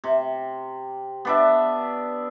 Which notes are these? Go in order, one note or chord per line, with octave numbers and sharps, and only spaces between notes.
C3
B3 D4 E5